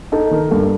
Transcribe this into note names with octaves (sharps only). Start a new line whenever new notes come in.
D#4 A4
D#3 A#4
G2 A4